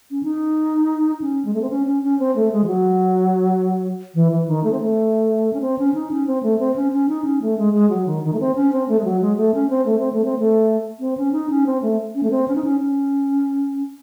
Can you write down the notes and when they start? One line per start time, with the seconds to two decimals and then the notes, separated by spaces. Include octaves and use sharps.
0.11 C#4
0.23 D#4
1.21 C#4
1.45 G#3
1.54 A3
1.62 C4
1.70 C#4
1.86 C#4
2.03 C#4
2.19 C4
2.36 A3
2.52 G#3
2.64 E3
2.67 F#3
4.15 E3
4.32 E3
4.48 D#3
4.64 A3
4.72 C4
4.81 A3
5.53 C#4
5.61 C4
5.78 C#4
5.94 D#4
6.11 C#4
6.27 C4
6.43 A3
6.59 C4
6.76 C#4
6.92 C#4
7.09 D#4
7.24 C#4
7.42 A3
7.58 G#3
7.73 G#3
7.90 F#3
8.06 D#3
8.24 D#3
8.33 A3
8.40 C4
8.55 C#4
8.72 C4
8.89 A3
8.99 G#3
9.05 F#3
9.21 G#3
9.37 A3
9.54 C#4
9.70 C4
9.86 A3
9.99 C4
10.13 A3
10.25 C4
10.39 A3
11.00 C4
11.17 C#4
11.33 D#4
11.50 C#4
11.66 C4
11.82 A3
12.15 C#4
12.23 A3
12.31 C4
12.48 C#4
12.55 D#4
12.64 C#4
12.80 C#4